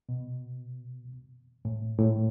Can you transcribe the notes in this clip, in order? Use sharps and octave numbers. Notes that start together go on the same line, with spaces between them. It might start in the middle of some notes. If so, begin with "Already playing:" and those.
B2
A2
A2